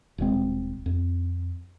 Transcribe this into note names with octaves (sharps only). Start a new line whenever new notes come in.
D#1 B2 G#3 C4
F2